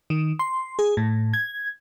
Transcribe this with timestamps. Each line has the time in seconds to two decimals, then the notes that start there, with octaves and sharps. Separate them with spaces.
0.10 D#3
0.39 C6
0.79 G#4
0.97 A2
1.33 G#6